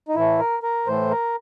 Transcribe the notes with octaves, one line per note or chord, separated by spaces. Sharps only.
D#4
A2 E3 A3 E4
A#4
A#4
A2 E3 A3 C5
A#4